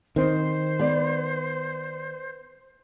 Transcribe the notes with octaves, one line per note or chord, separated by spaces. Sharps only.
D#3 C4 C5
B3 D5